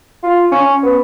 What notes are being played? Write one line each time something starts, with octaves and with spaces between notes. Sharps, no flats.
F4
C#4
B3